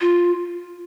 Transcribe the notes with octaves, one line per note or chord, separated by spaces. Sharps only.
F4